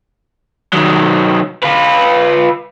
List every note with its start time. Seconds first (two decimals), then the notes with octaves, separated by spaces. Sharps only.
0.73 D#3 F#3
1.62 F4 B4